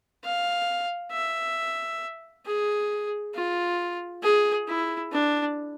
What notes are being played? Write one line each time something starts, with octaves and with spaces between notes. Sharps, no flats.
F5
E5
G#4
F4
G#4
E4
D4